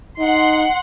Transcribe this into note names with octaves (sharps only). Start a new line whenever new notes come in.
D#4 F#5 C6